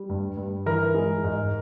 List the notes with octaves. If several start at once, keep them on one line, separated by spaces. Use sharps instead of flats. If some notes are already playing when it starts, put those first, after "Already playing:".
Already playing: G3
G2
G2
E3 A#4
G#3
G#2